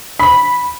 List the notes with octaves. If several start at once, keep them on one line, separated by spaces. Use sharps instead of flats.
B5